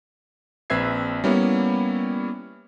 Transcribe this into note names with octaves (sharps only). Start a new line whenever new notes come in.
A#1 C4 B4 E5 G#6 C7
G3 A#3 B3 C#4 E4